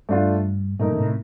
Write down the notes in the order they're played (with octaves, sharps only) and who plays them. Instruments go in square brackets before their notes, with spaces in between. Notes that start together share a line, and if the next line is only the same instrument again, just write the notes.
[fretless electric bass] G2 [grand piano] A3 D4 F4
[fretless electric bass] G2 A#2 [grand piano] A3 D#4 A#4
[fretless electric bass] D3
A2 C3